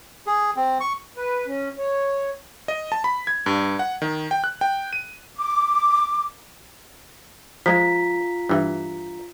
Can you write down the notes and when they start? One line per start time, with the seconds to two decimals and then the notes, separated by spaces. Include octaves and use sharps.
0.27 G#4
0.56 C4
0.80 C#6
1.17 B4
1.47 C#4
1.78 C#5
2.68 D#5
2.92 A5
3.04 B5
3.27 G#6
3.46 G2
3.79 F#5
4.02 D#3
4.31 G5
4.44 F#6
4.61 G5
4.93 D#7
5.38 D6
7.66 F3 G#3 F4 A#5 B6
8.49 G2 E3